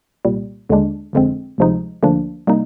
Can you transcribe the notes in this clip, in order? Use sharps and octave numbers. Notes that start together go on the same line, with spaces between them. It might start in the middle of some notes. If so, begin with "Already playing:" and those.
C2 A#2 G3
D#2 D3 G#3 D4
G1 F2 D3 G#3 C4
D2 C3 F3 G#3 D#4
D2 D3 F3 A#3 D4
C3 G3 A#3 D#4